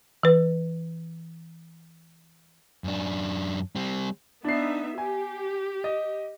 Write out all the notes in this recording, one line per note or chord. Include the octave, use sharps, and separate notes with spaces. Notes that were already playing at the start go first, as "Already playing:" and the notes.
E3 B4
F#2 D4
G3 C4
B3 D4 D#4 E5 C7
G4 G#5
D#5